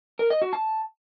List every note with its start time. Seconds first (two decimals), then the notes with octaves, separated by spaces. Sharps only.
0.19 A#4
0.30 D#5
0.42 F#4
0.53 A5